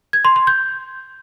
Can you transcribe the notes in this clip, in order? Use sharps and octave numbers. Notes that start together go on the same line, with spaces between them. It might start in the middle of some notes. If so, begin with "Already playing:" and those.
G#6
C6
C6
G6